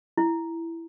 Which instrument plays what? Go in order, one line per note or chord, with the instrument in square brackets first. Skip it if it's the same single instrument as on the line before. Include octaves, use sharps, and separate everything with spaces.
[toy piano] E4